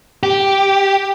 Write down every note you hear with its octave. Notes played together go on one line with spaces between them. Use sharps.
G4